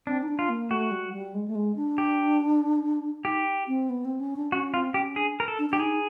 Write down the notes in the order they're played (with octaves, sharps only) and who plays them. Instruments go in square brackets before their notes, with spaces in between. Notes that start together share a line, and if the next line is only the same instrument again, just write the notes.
[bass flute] C4 [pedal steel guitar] D4
[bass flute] D#4
D4
[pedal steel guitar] F4
[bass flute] A#3
[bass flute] A3 [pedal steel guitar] F#4
[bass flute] G3
G3
G#3
A3
G#3
D4
[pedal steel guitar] G4
[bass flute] D#4 [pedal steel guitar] G4
[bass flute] C4
B3
C4
C#4
D4
[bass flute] C#4 [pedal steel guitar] F#4
[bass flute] C4 [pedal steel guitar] F4
[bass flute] C#4 [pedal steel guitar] G4
[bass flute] D4 [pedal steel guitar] G#4
[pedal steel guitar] A#4
A4
[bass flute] D4
[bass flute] D4 [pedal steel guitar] G4
[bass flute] D#4 [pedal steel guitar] G#4